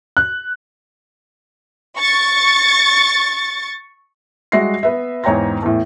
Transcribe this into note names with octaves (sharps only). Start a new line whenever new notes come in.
F#6
C#6 A6
G3 G#3 F#4 E5 A#6 C7
B3 B4 E5
E2 G#2 C#5 G5 A#5 A#6
E2 A2